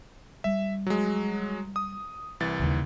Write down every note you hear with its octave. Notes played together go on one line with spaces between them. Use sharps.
G3 E5
F#3 G#3
D#6
C2 E3 A6
D#2 C#3